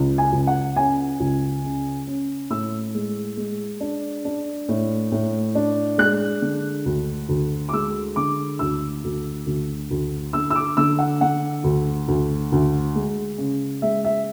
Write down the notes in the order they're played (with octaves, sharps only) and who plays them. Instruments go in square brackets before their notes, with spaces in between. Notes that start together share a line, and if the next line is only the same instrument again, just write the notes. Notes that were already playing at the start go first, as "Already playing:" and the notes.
Already playing: [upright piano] C#2
G#5
C#2
F#5
C#4 G#5
C#2
C#3
C#4
A2 E6
G#3
G#3
D4
D4
A2
A2
D4
G#3 F#6
D3
D2
D2
D6
G#3 E6
D3 D6
D2 E6
D2
D2
D2
D3 E6
E6
D6
D3 E6
F#5
D3 F#5
D2
D2
D2
G#3
C#3
G#3 E5
E5